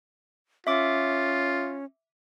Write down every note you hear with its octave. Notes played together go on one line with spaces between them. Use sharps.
C#4 F4 E5 D6